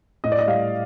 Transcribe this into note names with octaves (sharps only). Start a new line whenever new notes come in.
A2 D#5
D5
D#5
G3 F5